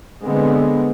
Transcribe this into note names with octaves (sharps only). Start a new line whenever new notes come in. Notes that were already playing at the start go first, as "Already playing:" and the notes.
D3 G#3 B3 C4